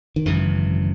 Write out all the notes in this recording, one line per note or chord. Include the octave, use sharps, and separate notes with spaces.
D#3
G#1 F#2 C#3 E3